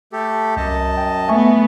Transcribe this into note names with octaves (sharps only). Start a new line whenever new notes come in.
A3 G4 A4
C2 F#2 D#5 A5
G5
A3 B3 E5 G#5 C#6